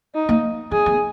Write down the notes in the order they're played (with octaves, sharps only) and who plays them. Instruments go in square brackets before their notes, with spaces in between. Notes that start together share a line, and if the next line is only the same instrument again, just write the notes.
[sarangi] D#4
[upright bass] A#3
[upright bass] B3 [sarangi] G#4
[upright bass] B3